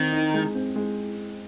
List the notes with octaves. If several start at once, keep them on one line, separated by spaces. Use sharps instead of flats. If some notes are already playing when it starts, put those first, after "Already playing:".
Already playing: D#3 C4
D#4
G#3
C4
G#3